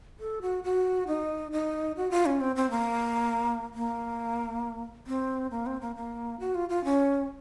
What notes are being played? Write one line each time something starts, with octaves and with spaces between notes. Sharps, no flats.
A4
F#4
F#4
D#4
D#4
F#4
F4
C#4
C4
C4
A#3
A#3
C4
A#3
C4
A#3
A#3
F#4
F4
F4
C#4